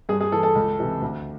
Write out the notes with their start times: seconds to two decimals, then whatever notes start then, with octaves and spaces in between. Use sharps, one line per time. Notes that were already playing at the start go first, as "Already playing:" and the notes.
0.09 G2 G#4
0.21 G#4
0.32 E3 A4
0.43 A4
0.55 C#2
0.79 C3 E3
1.01 D2